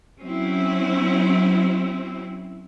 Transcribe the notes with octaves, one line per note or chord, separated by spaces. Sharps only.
F#3 C4 C#4 E4